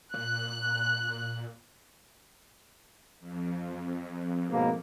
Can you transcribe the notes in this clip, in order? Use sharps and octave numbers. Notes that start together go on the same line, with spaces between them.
A#2 F#6
F2
G#2 B2 A#3